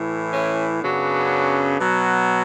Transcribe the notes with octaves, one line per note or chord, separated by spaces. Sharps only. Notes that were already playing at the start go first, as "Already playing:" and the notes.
Already playing: A2 E3
C#4 E4
F#2 C#3 F#3 B3 D4
B2 F#3